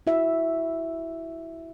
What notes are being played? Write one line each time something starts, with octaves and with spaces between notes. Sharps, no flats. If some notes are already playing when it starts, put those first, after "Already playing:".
E4 F#4 E5